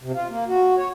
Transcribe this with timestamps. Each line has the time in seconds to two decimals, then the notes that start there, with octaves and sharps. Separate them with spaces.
0.01 C3
0.13 F4
0.29 A#3
0.48 F#4
0.77 C#5